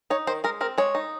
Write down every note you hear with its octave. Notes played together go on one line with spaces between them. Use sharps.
D#4 C#5
D#3 C5
G#3 A#4
C4 A#4
G#3 C#5
D#4